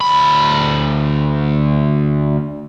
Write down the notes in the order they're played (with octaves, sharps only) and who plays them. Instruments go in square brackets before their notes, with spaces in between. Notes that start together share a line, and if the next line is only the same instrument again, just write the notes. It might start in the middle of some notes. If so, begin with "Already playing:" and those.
[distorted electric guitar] D2 B5